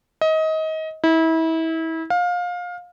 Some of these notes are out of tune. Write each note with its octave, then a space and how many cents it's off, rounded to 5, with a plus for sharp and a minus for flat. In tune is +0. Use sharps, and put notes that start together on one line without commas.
D#5 +25
E4 -30
F5 +25